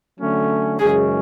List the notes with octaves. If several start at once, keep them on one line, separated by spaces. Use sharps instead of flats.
D3 F#3 A3 C#4
F#2 C#3 E3 G#3 C#4 G#4